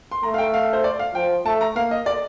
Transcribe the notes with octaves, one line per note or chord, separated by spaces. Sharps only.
C6
A3 A#5
F5
G5
F5
C5
D5
F5
F3 G5
A3 A5
A#5
A#3 F5
D#5
D5